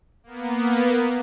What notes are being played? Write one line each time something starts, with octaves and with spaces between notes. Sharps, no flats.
A#3 B3